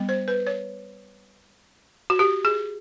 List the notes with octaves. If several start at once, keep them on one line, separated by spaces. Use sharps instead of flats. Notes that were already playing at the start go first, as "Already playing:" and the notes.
Already playing: G3 B3 D4
C5
B4
C#5
F#4
G4
G#4